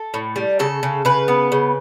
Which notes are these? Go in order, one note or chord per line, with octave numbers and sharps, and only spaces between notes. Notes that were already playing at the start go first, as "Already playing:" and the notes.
Already playing: A4
A2
G3
C#3 A4
C#3
C#3 B4
B3
C#3